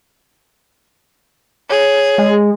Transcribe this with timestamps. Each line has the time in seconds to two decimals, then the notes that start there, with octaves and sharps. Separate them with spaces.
1.70 G#4 C#5
2.18 G#3